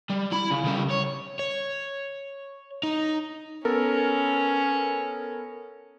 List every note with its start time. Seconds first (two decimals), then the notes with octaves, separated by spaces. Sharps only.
0.10 G3
0.32 E4 B5
0.51 C#3
0.64 C#3 G3
0.90 C#5
1.39 C#5
2.83 D#4
3.65 B3 C#4 A4 A#4